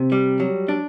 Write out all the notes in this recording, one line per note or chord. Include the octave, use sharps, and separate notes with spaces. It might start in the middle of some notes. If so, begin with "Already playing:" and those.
Already playing: C3
G3
F#3
D4